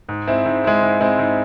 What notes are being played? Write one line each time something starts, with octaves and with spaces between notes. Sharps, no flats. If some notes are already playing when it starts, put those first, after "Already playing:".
G#2
G#3 C4 E4
G#2
G#3 C4 E4
G#2
G#3 C4 E4
G#2